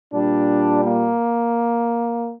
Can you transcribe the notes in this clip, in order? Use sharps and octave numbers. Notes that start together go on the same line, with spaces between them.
A#2 G3 D4
A#3